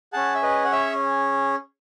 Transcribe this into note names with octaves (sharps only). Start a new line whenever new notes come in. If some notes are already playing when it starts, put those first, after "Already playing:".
C#4 G#4 F#5 A5
E5
B4 D#5
F#5
C#5 E5